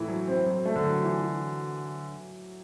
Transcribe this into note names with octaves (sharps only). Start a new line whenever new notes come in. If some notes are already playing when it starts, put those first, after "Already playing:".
Already playing: A2 E3
F#3
C4
F#3
A3
D3
F#3
E3
E3